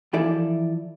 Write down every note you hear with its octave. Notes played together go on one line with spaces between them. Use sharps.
E3 F3 E4 A4 D5